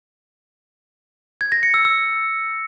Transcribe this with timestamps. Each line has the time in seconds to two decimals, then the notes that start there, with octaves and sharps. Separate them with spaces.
1.41 G#6
1.52 A#6
1.63 C#7
1.74 E6
1.85 E6